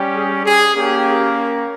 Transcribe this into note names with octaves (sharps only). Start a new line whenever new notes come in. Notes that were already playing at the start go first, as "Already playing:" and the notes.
Already playing: G3 C#4 G4
G#4
G#4
A#3 C#4 G4